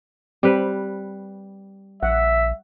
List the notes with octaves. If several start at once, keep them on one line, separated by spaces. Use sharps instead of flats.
G3 C4 B4
A#1 E5 F#5